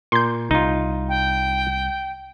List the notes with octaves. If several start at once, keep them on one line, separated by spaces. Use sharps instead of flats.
A#2 C6 G6
C2 D#4 F4
G5